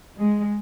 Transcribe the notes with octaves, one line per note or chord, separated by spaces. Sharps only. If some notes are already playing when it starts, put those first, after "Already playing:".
G#3